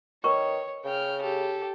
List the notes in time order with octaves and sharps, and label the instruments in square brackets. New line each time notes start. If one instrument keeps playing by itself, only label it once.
[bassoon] D#3 [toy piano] A#4 B4 C#6 [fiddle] C#5
[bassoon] C#3 [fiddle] G5 F6
[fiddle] G4 A4